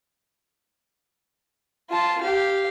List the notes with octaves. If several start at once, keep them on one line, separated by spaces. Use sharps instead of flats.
F4 A5
G4 F5